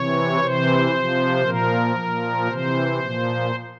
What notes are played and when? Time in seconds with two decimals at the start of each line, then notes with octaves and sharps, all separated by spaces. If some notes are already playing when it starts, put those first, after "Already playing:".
Already playing: C3 E3 C#5
0.41 C3 E3 C5
0.92 C3 F3
1.44 A#2 F3 A#4
1.96 A#2 F3
2.47 C3 E3 C5
2.99 A#2 F3